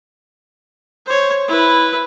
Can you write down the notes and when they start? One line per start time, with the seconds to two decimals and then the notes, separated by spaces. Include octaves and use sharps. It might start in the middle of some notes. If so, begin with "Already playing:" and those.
1.06 C5 C#5
1.48 E4 B4